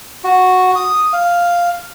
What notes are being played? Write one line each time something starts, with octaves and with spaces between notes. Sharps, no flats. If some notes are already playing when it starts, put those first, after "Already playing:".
F#4
D#6
F5